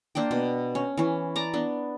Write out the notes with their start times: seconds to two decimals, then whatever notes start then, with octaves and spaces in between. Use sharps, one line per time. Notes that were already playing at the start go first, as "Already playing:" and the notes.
0.15 A#3 D4 C5 G5
0.31 B2
0.75 C#4
0.97 E3 C#4
1.36 D5 A5 A#5
1.54 B3 D4